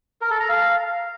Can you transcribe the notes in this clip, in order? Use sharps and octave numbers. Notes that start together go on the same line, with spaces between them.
A#4
A4
A#5
F5